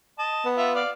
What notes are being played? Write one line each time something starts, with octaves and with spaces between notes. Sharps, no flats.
D#5 A5
B3
F4 E5 F#5
D5 F5